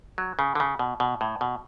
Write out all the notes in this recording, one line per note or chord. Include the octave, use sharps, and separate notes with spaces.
F#3
C#3
D3
C#3
B2
B2
A2
B2